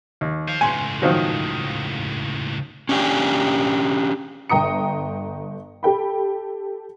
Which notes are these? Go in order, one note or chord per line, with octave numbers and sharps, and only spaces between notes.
D#2
C5 F5
C#2 A2 G#5 C6
D#3 F3 F#3
C#4 D4 G4 F5 G#5
G1 G5 A#5 D#6 C#7
G4 A4 G5 B5